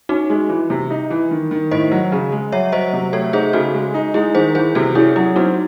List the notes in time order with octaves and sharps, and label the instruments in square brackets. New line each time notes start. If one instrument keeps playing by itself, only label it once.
[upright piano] C#4 [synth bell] D#4 F#4
[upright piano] G#3
E3
C3
D#4
E3
D#3
D#3
[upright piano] A2 [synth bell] C5 D#5
[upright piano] F#3
C#3
G#3
[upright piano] F#3 [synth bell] C#5 E5
[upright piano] F#3 [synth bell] C5 D#5
[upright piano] C3
[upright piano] A3 [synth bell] A4 C#5
[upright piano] D#4 [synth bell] G#4 C5
[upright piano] C#3 [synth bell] F#4 A4
[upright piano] G#3
D#4
[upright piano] G#3 [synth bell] E4 G#4
[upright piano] D#3 [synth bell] G#4 C5
[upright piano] E3 [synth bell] G#4 C5
[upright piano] C3 [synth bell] F#4 A4
[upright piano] C#4 [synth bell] E4 G#4
[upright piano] F#3 [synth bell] E4
[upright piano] C4 [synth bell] D#4 F#4